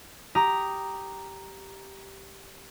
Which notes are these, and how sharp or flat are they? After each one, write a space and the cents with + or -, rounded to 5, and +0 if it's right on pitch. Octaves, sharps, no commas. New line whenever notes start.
G4 -5 A#5 +0 D#6 +0